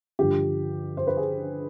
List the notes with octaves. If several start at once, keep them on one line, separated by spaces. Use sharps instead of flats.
G2 D3 F3 G4
C5
B4
G#4